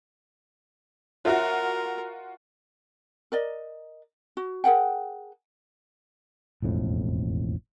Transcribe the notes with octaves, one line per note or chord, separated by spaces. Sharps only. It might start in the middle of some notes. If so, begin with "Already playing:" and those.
F4 F#4 A#4 C#5 E5 F#5
A#4 D5 D#5
F#4
G#4 A#4 F#5 G5
E1 A1 F2 A2